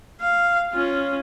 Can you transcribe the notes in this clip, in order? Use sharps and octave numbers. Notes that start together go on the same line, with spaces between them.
F5
C#4 F4